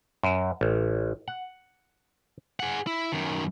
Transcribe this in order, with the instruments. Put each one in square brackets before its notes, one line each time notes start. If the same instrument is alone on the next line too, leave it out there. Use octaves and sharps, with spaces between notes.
[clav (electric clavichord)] F#2
A1
F#5
[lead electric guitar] G#4 F#5
E4
F#2 D#3